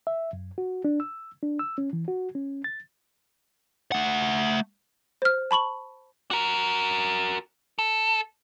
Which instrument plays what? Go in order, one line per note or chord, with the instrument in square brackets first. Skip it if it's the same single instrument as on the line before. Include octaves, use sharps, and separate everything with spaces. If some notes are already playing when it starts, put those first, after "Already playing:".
[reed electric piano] E5
F#2
F#4
D4
E6
D4
E6
C#4
E3
F#4
C#4
A6
[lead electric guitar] A3 F#5
[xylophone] C5 F6
A5 B5 C#6 F#7
[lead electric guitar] F#4 A#4
A4